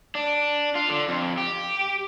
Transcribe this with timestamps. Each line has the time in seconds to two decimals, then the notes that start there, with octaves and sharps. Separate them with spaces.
0.15 D4
0.75 F4
0.89 D3
1.08 F2
1.38 G4